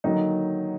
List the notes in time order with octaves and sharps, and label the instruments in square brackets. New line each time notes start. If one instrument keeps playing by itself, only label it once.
[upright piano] D3 D#3 F#3 A#3 D#4